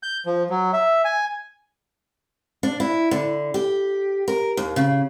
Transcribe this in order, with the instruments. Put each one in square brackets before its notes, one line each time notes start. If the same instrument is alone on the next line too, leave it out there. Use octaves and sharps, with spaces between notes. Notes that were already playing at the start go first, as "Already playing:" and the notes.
[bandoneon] G6
F3
F#3
E5
G#5
[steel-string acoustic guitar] D4
E4
D3
G4
A#4
D#2
C#3